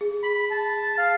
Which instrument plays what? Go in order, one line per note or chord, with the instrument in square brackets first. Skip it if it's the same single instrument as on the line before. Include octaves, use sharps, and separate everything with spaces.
[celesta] G#4
[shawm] B5
A5
F5